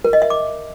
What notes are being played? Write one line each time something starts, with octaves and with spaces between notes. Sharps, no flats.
A#4
D#5
E5
D6